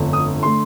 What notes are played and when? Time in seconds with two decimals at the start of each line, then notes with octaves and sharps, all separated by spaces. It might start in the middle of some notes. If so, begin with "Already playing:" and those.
Already playing: G1 F2 D3 A3
0.13 D#6
0.43 D3 A3 C6